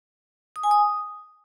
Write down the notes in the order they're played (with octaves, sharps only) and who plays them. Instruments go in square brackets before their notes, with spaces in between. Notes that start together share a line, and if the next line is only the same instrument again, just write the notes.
[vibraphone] D#6
G#5
D#6